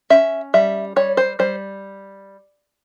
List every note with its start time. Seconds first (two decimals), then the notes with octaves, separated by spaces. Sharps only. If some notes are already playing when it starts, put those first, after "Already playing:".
0.10 C#4 E5
0.54 G3 E5
0.96 G3 C#5
1.17 C5
1.39 G3 C5